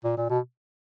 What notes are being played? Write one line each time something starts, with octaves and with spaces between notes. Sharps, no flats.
A#2
A#2
B2